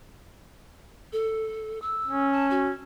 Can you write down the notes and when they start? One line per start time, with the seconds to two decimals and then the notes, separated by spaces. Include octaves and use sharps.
1.13 A4
1.82 E6
2.07 C#4
2.32 A5
2.50 F#4